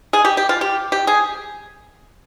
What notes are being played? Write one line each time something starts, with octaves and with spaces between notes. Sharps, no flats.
G#4
G4
G4
F4
G4
G4
G#4